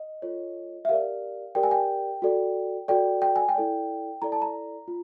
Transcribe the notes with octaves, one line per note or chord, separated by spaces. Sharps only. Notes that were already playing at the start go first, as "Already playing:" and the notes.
Already playing: D#5
F4 A4 C#5
E5
G4 A#4 D5 F5
G4 A#4 D5 G5
G#5
G5
F#4 A4 D5
F#4 A4 D5 G5
G5
G#5
G5
E4 A4 D5
E4 A4 D5 A#5
A5
A#5
F4